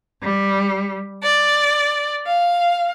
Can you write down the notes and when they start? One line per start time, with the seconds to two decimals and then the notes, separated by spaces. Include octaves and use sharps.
0.23 G3
1.22 D5
2.26 F5